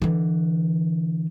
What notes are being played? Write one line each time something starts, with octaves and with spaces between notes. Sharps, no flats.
D3 E3